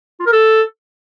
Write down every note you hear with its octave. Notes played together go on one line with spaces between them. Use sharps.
F4
A#4
A4